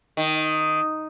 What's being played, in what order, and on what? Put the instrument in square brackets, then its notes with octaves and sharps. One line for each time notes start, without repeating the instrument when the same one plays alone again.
[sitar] D#3